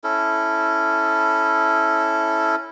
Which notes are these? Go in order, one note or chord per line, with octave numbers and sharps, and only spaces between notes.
C#4 E4 A4